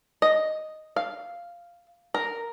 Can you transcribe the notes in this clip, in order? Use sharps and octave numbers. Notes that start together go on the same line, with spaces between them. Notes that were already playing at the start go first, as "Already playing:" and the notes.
D#5
F5
A#4